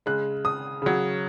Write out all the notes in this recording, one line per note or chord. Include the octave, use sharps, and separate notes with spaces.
C#3 G#3 F#6
D#6
C#3 F#3